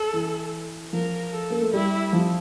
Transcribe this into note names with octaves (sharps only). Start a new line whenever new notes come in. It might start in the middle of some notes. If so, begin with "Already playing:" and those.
Already playing: A4
E3
F3 A#4
A4
A#3
A3
G3 E4
F3